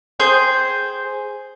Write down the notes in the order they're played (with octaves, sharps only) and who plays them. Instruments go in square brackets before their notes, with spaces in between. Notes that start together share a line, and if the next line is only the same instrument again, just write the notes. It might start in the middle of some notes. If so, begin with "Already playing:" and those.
[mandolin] G#4 C5 G5